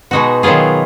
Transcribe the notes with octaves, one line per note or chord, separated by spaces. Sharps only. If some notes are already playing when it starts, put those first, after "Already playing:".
B2 G#3 D#4 F#4
D#3 F#3 B3 F4 G#4